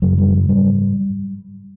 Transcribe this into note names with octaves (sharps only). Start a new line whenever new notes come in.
F#2 C#3 F#3
G3
F#3
G#2 G3